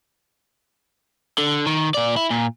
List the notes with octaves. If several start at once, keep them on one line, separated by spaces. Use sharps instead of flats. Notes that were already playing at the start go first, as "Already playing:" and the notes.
D3
D#3
A#2 D5
E4
A#2